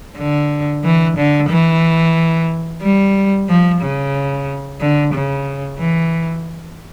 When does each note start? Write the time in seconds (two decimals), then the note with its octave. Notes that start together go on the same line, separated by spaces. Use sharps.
0.18 D3
0.84 E3
1.17 D3
1.49 E3
2.83 G3
3.48 F3
3.82 C#3
4.80 D3
5.13 C#3
5.79 E3